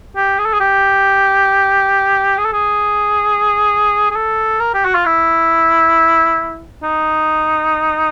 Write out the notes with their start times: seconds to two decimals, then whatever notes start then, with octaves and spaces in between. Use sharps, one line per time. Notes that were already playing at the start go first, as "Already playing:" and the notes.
0.16 G4
0.38 G#4
0.45 A4
0.53 G#4
0.60 G4
2.38 G#4
2.45 A4
2.53 G#4
4.10 G#4
4.16 A4
4.60 A#4
4.74 G4
4.85 F#4
4.95 F4
5.06 E4
6.83 D#4